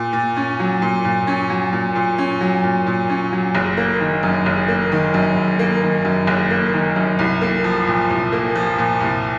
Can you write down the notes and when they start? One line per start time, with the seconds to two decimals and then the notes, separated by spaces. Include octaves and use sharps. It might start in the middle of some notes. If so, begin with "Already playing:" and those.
Already playing: A#2
0.13 A#2
0.36 C#4
0.59 F#3
0.82 A#2
1.04 A#2
1.27 C#4
1.50 F#3
1.73 A#2
1.95 A#2
2.18 C#4
2.41 F#3
2.64 A#2
2.86 A#2
3.09 C#4
3.32 F#3
3.55 F#1
3.77 A#3
4.00 D#3
4.23 F#2
4.46 F#1
4.68 A#3
4.92 D#3
5.14 F#2
5.37 F#1
5.59 A#3
5.82 D#3
6.05 F#2
6.27 F#1
6.51 A#3
6.73 D#3
6.96 F#2
7.19 C2
7.41 A#3
7.64 F3
7.87 A#2
8.10 C2
8.32 A#3
8.55 F3
8.78 A#2
9.00 C2